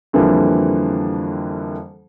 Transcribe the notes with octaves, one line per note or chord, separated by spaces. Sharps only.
F2 D3 E3 F3 G3 A#3